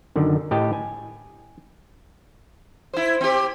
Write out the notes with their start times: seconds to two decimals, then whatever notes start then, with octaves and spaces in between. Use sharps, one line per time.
0.16 F#2 D3 D#3
0.51 A2 G4 D#5 G5 A5
0.73 G#5
2.94 E4 C5
3.21 C4 G4